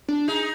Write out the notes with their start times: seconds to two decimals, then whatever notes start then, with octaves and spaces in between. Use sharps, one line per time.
0.08 D4
0.28 D#4 G#4